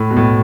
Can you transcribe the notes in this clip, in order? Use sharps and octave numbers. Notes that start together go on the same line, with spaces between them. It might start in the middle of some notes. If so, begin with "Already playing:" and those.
Already playing: A2
B2
A2